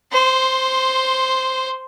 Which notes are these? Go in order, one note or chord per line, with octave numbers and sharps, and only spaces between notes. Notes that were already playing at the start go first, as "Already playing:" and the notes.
C5 C6